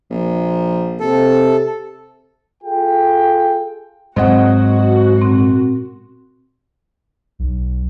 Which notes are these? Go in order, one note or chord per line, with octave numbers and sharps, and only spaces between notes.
A#1
C3 A4
F4 G#4 A4 G5
G#2 F#3 C4 F#4 C5 D#5 F#5
A#2 C4
B1